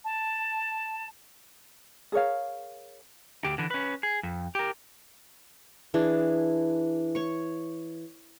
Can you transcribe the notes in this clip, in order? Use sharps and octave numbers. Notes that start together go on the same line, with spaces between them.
A5
G#4 A#4 C#5 F5
D2 G4
D3 E3
C#4 B4
G#4
F2
G4 A#4
E3 D4 G#4
C#5 C#6